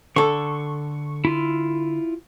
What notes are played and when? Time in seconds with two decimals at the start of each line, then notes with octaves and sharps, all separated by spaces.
0.16 D3 A4 C#6
1.25 E4 F4